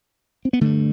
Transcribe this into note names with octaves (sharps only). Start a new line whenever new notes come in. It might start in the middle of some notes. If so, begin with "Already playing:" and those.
C4
B3
G2 D3 A3